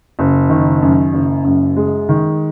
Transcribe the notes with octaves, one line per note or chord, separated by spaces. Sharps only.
F#1
D#3
F#2
F#1
F#2
G#3
D#3